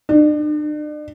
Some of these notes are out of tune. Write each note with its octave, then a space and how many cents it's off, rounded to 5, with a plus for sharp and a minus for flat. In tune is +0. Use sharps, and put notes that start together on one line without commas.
D4 +40